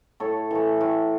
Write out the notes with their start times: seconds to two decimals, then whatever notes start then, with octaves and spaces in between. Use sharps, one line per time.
0.20 A2 A4 C#5
0.51 E3 A3
0.81 A2